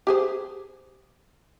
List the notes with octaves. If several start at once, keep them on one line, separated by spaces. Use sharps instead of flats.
G4 G#4 C5